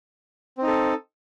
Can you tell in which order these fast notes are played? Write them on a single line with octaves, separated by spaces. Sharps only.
C4 D#4 A4